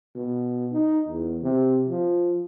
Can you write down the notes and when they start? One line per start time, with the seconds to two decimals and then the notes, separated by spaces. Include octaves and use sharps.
0.15 B2
0.72 D#4
1.08 E2
1.42 C3
1.89 F3